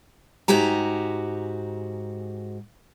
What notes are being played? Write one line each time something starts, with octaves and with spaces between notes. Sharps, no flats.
G#2 F#4 G4 G#5 A#5